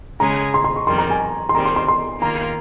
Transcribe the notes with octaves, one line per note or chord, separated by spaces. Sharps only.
C#3 G#3 C#4 G#4 A#5
C6
C6
C#6
F2 D#3 G3 C6
A#5
G#5
C6
D#2 D#3 G3 C4 A#5
C6
C6
C6
D#3 A#3 F4 A#5